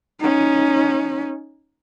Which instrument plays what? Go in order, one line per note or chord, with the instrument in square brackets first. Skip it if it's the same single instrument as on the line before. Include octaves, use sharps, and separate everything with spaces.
[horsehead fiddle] C#4 D#4